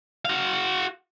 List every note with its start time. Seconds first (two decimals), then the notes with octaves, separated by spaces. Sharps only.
0.25 F#4 F5